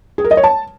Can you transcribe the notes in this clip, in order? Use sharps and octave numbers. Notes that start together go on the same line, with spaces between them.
G#4
A#4
D#5
C#5
A5